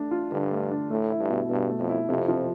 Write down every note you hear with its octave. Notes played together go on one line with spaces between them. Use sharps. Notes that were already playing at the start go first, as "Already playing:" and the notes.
Already playing: A3 D4
F4
G2 D3
A3
D4
A2 A3
E4
G2
B2
G2 B2
A3
F2
E4
F2 C3
F3